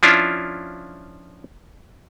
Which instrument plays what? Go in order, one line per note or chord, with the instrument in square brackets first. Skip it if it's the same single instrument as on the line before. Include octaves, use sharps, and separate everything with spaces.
[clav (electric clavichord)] F3 C#4 D4 E4 F4